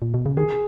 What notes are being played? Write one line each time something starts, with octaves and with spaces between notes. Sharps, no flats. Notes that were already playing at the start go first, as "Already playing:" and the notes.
A#2
B2
C#3
D#3 G#4